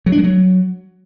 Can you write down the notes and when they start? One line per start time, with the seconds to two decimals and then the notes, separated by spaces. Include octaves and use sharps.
0.06 F#3
0.12 D4
0.18 G#3
0.24 F#3